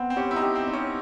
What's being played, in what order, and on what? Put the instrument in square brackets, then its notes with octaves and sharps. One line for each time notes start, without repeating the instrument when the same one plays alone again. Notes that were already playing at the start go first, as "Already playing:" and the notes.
Already playing: [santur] B3 [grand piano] C4
[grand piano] C4
[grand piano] C#4 [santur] G4
[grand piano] E4
D#4
[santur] G4
[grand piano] C4
[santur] D#4
[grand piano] C#4